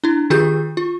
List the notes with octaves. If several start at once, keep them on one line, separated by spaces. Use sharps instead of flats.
D4 E4
D#3 F4 G4 G#4 G6
F4